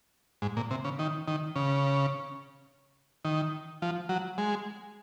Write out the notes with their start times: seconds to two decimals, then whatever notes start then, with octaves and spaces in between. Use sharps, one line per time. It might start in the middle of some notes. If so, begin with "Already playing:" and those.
0.42 G#2
0.57 A#2
0.71 C3
0.85 C#3
0.99 D#3
1.28 D#3
1.56 C#3
3.25 D#3
3.82 F3
4.09 F#3
4.38 G#3